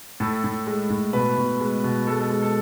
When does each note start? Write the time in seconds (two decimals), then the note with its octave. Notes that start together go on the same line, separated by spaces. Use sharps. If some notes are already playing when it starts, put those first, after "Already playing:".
0.20 A2 A4
0.44 A2
0.67 G#3
0.90 A2
1.13 B2 B4
1.37 B2
1.61 G#3
1.84 B2
2.07 G#3 A4
2.19 A4
2.30 G#3
2.42 A4